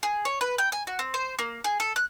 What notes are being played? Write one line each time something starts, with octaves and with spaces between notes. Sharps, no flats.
G#4
C#5
B4
G5
G#5
F#4
C4
C5
A#3
G#4
A4
F#6